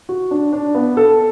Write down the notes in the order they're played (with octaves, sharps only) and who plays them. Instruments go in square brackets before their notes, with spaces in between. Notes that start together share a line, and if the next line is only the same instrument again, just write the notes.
[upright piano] F#4
D4
D4
B3
A4